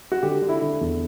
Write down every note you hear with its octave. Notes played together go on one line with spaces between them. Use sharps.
F#4
D3 G4
D3
E4
D3
E2